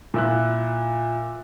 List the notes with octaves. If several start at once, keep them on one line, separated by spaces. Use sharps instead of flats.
A#2 E4 F#6